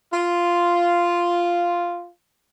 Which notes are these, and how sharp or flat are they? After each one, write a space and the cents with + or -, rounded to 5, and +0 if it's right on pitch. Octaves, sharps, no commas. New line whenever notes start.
F4 -5